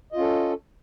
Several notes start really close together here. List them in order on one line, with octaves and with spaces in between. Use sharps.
D#5 F4 C#4 A4